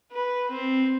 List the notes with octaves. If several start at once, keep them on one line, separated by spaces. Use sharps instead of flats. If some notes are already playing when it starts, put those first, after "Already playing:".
B4
C4